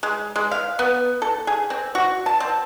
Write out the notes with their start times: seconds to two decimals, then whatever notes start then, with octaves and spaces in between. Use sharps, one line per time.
0.03 G#3
0.36 G#3
0.51 F5
0.79 B3
1.22 A4
1.47 G#4
1.70 C4
1.95 F#4
2.26 A5
2.40 C4